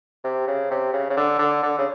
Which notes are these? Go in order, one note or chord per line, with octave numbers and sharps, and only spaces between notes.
C3
C#3
C3
C#3
C#3
D3
D3
D3
C#3